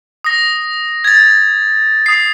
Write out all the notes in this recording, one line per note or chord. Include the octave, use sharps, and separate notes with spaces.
D#6 A#6
G#6 A6
D#6 C7